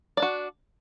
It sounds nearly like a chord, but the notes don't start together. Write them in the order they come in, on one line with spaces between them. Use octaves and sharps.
D5 D4 F#4